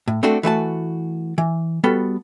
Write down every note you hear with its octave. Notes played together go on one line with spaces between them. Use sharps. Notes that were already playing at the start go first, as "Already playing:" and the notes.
A2
A3 C4 D4 F#4 A4
E3 A3 F#4 A5
E3
G3 B3 F#4 A4